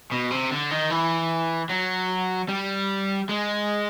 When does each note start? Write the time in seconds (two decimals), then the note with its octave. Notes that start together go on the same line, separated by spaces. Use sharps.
0.11 B2
0.30 C3
0.51 D3
0.70 D#3
0.90 E3
1.70 F#3
2.49 G3
3.29 G#3